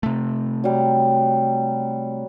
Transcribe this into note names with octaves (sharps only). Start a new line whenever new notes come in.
C3 A3
F#3 G3